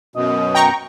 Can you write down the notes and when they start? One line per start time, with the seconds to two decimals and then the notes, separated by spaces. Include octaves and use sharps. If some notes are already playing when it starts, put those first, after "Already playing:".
0.16 F#2 B2 D#5
0.55 G5 A#5 C#6